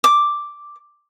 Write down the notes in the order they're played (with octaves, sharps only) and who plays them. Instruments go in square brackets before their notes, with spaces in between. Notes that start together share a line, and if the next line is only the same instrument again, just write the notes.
[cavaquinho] D6